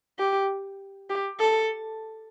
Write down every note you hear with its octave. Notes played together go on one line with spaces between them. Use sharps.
G4
G4
A4